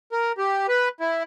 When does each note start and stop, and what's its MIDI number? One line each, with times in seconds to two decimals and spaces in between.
0.12 0.32 70
0.38 0.67 67
0.68 0.89 71
1.00 1.23 64